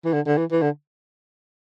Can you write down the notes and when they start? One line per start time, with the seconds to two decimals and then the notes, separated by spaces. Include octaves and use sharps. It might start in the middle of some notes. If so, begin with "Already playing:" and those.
0.05 E3
0.13 D3
0.26 D3
0.37 E3
0.51 E3
0.62 D3